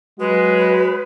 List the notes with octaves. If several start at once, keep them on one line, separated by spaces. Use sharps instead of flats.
F#3 G#3 F#4 B4